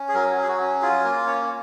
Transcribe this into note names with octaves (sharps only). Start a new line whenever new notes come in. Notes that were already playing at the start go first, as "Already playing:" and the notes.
Already playing: C#4
G#4
F#3 A#4
F#3
G#4
F#4
C#4
F4 G#4
A#3 A#4
C#4 C#5